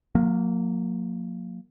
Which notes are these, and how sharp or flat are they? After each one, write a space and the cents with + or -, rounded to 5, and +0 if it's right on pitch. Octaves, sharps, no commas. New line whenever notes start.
F#3 -45 A#3 -15